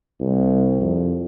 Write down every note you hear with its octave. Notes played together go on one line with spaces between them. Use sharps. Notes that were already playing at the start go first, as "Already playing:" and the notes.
C2
F2